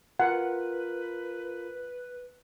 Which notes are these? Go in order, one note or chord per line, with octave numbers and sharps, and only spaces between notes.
F4 A#4 B4 F#5